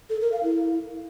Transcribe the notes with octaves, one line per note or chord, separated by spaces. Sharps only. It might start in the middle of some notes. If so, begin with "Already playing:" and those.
A4
A#4
F5
E4